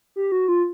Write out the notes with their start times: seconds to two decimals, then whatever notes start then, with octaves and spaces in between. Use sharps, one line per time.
0.16 G4
0.32 F#4
0.48 F4